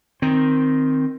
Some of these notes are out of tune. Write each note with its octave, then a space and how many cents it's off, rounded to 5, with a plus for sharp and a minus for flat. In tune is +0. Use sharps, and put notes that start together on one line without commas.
D#3 +0 C4 +0